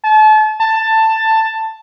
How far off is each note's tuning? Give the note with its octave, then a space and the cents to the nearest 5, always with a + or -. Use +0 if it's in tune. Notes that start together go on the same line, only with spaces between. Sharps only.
A5 -35
A5 +10